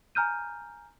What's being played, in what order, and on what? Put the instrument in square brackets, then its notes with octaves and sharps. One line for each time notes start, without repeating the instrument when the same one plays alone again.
[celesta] G#5 A#5 F6 G6 D#7